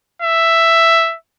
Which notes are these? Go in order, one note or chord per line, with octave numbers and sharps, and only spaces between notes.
E5